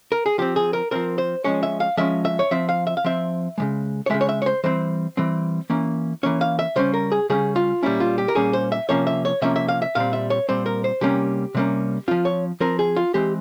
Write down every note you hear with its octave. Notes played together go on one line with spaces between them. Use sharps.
A#4
G#4
F3 C4 G4
G#4
A#4
F3 C4 A#4
C5
F3 G#3 C#4 C#5
E5
F5
F3 G#3 C#4 E5
E5
C#5
F3 C4 E5
F5
E5
F5
F3 C4 E5
C#3 F3 G#3
C#5
C#3 F3 G#3 E5
C#5
E5
C#5
C5
E3 G3 C4 C5
E3 G3 C4
E3 A#3 C#4
E3 A#3 C#4 C#5
F5
E5
C#3 G3 C#4 C5
A#4
G#4
C#3 G3 C#4 G#4
F4
A#2 G3 A#3 C#4 E4
F4
G4
A#4
A#2 G3 A#3 C#4 G#4
C5
E5
C3 F3 A#3 C#4 C#5
E5
C#5
C3 F3 A#3 C#4 E5
E5
F5
E5
A#2 G3 C4 F5
E5
C#5
A#2 G3 C4 C5
A#4
C5
C3 G3 A#3 C#4 G4
C3 G3 A#3 C#4
F3 C4 F4
C#5
F3 C4 A#4
G#4
F4
E3 G#3 C4 G4